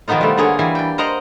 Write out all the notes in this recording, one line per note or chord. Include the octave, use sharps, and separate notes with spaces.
B2 D#3 F3 B3 D#4 F4
G3 A3
D3 A#3 G#4 C#5
E3 G3 G#5
D4 G5
A#4 C5 D#5 F#5 A#5 C6